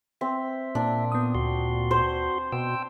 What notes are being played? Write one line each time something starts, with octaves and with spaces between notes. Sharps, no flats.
C4 E5
A#2 D4
B3 D#6
D2 F#4 C6
C5
B2 G5 E6